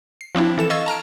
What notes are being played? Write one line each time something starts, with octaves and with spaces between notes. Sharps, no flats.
C7
F3 C4 D4 E4
E3 A4 E7
D#5 F5 C#6 E6 G#6 A6
A5 A#5 F6 D7